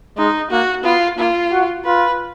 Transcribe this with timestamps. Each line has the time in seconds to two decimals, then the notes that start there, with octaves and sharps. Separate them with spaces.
0.18 G#3 D#4
0.51 A#3 F#4
0.84 B3 F4
1.18 A#3 F4
1.52 F#4
1.85 F4 B4